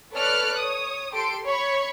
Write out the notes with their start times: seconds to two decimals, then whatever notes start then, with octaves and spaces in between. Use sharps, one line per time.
0.12 A4 B4 C#5 D5 F6 F#6
0.58 C#5 D#6
1.13 G4 A4 C6 D7
1.45 C#5 B5 C#6